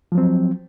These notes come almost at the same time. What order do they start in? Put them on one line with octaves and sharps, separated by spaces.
F3 F#3 C4